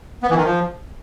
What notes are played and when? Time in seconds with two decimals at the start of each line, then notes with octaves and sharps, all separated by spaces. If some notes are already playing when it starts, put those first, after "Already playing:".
0.23 B3
0.30 E3
0.37 D#3
0.45 F3